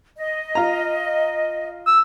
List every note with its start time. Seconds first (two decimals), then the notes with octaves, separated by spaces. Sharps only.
0.17 D#5
0.55 F4 A#5
1.87 E6